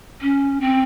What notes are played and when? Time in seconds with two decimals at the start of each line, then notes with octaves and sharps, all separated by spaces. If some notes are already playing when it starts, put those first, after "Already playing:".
0.21 C#4
0.60 C4